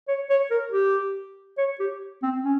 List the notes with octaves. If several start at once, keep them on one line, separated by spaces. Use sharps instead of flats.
C#5
C#5
A#4
G4
C#5
G4
C4
C#4